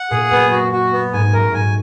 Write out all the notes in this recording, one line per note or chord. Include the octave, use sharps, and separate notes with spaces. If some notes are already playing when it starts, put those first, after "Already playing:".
Already playing: F#5
A#2 G#4
F#2 B3
F#4
F#4
B3
G#2 G#5
F#2 A#4
G#2 G#5